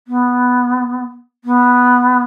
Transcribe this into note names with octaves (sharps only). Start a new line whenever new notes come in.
B3
B3